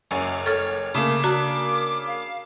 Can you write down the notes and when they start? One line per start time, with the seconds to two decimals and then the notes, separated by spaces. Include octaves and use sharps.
0.11 F#1 F#2 G#5 C#6
0.46 A4 C#5 F6
0.94 C#3 A3 A#3 D6
1.24 D4 F#4 A#5
2.07 F5